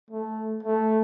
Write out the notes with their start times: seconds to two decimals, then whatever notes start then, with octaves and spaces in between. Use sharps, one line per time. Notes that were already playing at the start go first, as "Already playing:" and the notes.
0.10 A3
0.63 A3